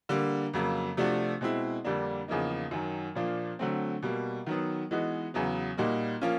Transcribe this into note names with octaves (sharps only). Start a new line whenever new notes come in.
D3 G3 A#3
F2 C#3 F#3 A#3
C3 F3 A3 D4 F#4
B2 G#3 C4 E4
F2 D3 G3 A#3 D4
E2 C#3 F3 A#3 D#4
F#2 D#3 F#3
A#2 F3 A#3 D4 F4
D3 F#3 A3 C4
B2 G3 A#3
D#3 F#3 B3
E3 G#3 B3 D#4 F#4
E2 C#3 F#3 B3
A#2 G3 A#3 D#4 F#4
F3 A#3 C#4 F4